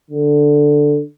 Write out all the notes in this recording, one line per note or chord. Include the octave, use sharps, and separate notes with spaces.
D3